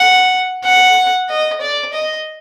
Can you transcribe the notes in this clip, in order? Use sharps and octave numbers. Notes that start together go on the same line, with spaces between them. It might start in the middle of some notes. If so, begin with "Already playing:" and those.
Already playing: F#5
F#5
D#5
D5
D#5